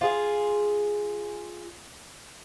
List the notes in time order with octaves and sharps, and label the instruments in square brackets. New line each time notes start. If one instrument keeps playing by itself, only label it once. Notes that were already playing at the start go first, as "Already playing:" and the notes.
[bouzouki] F4 G#4